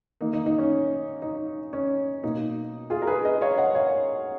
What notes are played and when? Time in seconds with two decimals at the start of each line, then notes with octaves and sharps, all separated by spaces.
0.21 D#3 A#3 D#4
0.33 D#4
0.46 D#4
0.58 C#4
1.22 D#4
1.73 C#4
2.24 B2 A#3 D#4
2.90 F4 G#4
3.02 A#4
3.07 G#4 B4
3.24 B4 D#5
3.41 C#5 F5
3.58 D#5 F#5
3.75 C#5 F5